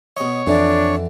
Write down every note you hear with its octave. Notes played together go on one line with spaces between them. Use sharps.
B2 C#5 D#5
F2 D3 E3 D4